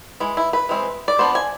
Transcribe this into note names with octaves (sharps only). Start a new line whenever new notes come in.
E3 G#3
E4
B4
E3 G#3 C4
D5
F3 B3 D4 C5
G#5